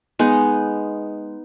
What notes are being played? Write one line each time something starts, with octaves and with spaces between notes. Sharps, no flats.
G#3 B3 D#4